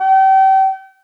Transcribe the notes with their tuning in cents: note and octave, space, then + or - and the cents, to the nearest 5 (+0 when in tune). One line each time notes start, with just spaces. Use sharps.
G5 -35